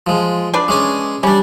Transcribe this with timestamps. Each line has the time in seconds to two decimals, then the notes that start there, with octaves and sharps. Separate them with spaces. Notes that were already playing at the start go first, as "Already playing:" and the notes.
0.07 F3 G#3
0.54 D4 B4 D5
0.68 G#3 C#4 G#5
1.23 G3 C#4 D4